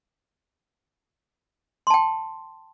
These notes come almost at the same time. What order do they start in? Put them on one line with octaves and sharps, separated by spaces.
C6 A5 G5